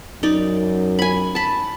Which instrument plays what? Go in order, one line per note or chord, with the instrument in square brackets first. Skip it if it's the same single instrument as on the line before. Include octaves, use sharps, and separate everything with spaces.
[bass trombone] F#2 [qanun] D#4 D5
[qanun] G#5 B5
A5 B5